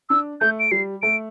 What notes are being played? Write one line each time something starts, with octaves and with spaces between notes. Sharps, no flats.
D4 E6
A3 G6
D7
G3 C7
A3 D7